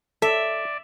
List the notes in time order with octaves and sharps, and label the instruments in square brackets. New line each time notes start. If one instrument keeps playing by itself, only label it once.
[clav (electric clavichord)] A4 [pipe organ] D5 [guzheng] E5